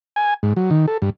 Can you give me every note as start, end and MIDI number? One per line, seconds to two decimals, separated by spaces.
0.16 0.34 80
0.43 0.53 44
0.56 0.70 54
0.71 0.86 51
0.88 0.97 69
1.02 1.10 43